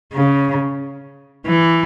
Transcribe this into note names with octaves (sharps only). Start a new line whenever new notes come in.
C#3
E3